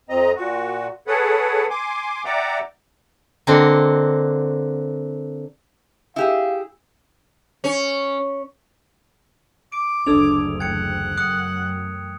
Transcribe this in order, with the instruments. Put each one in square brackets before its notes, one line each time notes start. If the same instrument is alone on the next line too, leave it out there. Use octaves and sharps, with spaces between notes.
[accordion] F2 C4 D#5 A#5
A#2 F#4
G#4 A4 B4 C#5 F#5
G#5 C6 D6
D5 E5 F#5 G5 A#5 D6
[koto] D3 A#3 C4 F#4 D#5
[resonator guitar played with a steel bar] E4 G4 G#4 [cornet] F5
[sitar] C#4
[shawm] D6 [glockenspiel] D7
[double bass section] F#1 D2 [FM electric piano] D4 A4 G#6 [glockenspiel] D#6 E6 F7
[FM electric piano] E3 A3 G5 [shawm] F#5 [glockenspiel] G#6 C#7
[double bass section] F#2 [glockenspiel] D#6 F#6 C#7